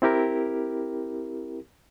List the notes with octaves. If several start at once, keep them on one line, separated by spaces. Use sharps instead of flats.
C4 E4 G4 A#4